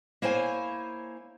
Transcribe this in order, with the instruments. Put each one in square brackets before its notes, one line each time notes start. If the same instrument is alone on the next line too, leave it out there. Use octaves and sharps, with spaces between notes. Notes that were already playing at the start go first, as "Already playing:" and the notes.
[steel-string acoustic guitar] A#3 E4 C5 C#5 G#5